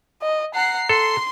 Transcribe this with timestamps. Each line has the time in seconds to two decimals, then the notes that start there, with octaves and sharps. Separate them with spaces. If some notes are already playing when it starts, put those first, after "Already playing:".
0.22 D#5
0.55 F#5 A#5 C7
0.89 A4 C6